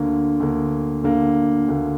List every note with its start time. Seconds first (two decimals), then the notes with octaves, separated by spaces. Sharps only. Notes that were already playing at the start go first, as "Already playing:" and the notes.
Already playing: D2 D3 A#3
0.40 D2 D3 A#3
1.04 D2 D3 A#3
1.68 D2 D3 A#3